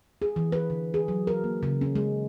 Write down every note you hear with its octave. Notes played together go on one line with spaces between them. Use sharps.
G#4
E3
B4
D3
G#4
F#3
A#4
A#3
C#3
C#4
G#3